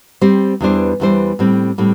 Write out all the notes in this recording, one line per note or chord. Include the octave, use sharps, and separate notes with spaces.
G3 C4 G4 C5
E2 E3 G3 D4 C5
E2 E3 G3 D4 C5
A2 G3 C4
A2 G3 C4